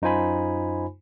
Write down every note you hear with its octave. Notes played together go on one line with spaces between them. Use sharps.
F#2 D#4 F4 C5 G#5 B5